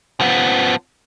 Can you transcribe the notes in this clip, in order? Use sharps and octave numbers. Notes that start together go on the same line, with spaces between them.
F3 B3